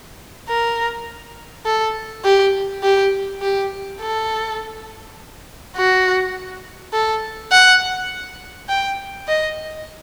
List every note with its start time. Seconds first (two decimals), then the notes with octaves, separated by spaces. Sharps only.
0.48 A#4
1.66 A4
2.24 G4
2.83 G4
3.42 G4
4.01 A4
5.76 F#4
6.93 A4
7.52 F#5
8.69 G5
9.28 D#5